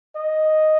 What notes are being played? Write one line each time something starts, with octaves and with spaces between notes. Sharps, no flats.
D#5